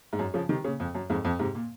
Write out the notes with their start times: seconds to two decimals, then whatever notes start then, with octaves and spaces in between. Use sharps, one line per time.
0.13 G#2
0.19 F#2
0.34 C#3 F3
0.49 C3 D#3
0.64 A#2 C#3
0.80 F2
0.95 F#2
1.10 F2 G#2
1.25 F2
1.39 G#2 C3
1.55 A#2